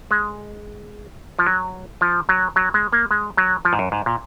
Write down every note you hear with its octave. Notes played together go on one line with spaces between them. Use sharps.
G#3
F3
F#3
F3
F#3
F#3
G#3
A#3
G#3
F#3
F3
G#2
F#2
G#2
A#2